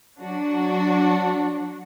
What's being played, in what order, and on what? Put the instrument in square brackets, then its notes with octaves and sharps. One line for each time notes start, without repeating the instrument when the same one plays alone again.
[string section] F#3 D4 F#4